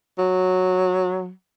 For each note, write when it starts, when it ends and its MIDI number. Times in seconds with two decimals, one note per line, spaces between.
0.18 1.31 54